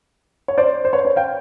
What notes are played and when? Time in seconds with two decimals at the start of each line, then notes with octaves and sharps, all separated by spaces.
0.48 C#5
0.58 C5 D5
0.85 C5
0.93 B4 C#5
1.05 B4 C#5
1.16 F5 G5